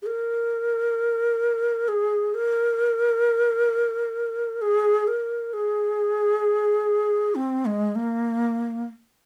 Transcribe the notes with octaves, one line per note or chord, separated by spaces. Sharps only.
G#4
A#4
G#4
A#4
G#4
A#4
G#4
C4
G#3
A#3